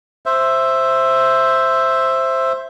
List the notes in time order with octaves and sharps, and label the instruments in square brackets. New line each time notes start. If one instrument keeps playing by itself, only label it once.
[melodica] C5 E5